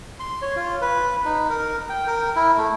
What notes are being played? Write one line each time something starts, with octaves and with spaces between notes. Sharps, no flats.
C6
C#5
F4
B4
D#4
A#4
G5
A#4
E4
A3